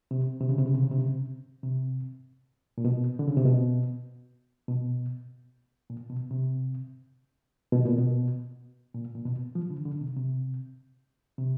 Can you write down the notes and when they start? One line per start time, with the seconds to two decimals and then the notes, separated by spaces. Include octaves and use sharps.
0.11 C3
0.40 C3
0.49 C#3
0.58 C3
0.66 C#3
0.74 C3
0.83 C#3
0.91 C3
0.99 C#3
1.08 C3
1.63 C3
2.78 A#2
2.85 B2
3.19 D3
3.28 C#3
3.37 C3
3.45 B2
4.68 B2
5.90 A#2
6.09 B2
6.31 C3
7.73 B2
7.85 A#2
7.98 B2
8.94 A#2
9.15 A#2
9.26 B2
9.55 F3
9.70 D3
9.86 D3
10.01 C3
10.16 C3
11.38 C3